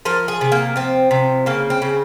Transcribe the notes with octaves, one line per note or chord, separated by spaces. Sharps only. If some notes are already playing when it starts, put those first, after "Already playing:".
F3 A#4
G#4
C3
A#3
F3 C4
C3
C#3 A#3
C4
C#3